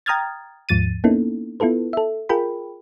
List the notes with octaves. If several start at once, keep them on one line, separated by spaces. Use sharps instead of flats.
G5 A#5 D#6 F6 G#6 A6
D#2 G#2 F3 A6 D#7
A#3 B3 C#4 D#4 E4 A4
B3 E4 F4 A4 B4
A4 E5
F4 G#4 A#4 G5 B5